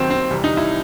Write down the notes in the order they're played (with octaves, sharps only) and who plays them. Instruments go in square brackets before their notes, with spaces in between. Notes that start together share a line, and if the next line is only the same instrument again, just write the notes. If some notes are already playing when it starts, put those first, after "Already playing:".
Already playing: [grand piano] D#2 D#3 F#3 C4
C4
C2 C3 E3 G3
D#4
E4